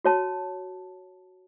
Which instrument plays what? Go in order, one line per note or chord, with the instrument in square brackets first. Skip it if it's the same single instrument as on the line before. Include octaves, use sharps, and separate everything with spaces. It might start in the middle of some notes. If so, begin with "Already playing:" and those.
[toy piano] F#4 C#5 A5